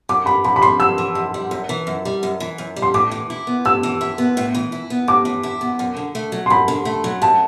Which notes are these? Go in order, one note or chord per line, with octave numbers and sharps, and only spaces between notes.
F#2 D6
E3 B5
F#2 B5
B5
G3 C6
F#2 E6
E3
F#2
G3
F#2
E3
F#2
G3
F#2
E3
F#2
G3
C6
A2 D6
E3
E4
B3
A2 E6
E3
E4
B3
A2
E3
E4
B3
A2 D6
E3
E4
B3
F#2
D3
A3
F#3
C6
F#2 B5
D3
A3
F#3
F#2 A5